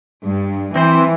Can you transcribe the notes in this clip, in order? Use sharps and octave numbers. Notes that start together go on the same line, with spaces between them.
G2
E3 C4 C5